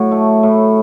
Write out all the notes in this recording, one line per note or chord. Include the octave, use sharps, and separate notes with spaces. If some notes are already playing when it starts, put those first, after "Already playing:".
Already playing: A2 F#3
A3
A2